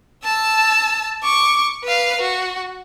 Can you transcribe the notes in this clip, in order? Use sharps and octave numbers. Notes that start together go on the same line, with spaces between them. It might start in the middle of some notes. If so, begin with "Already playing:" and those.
A5 E6
C#6 D6
B4 F5
F#4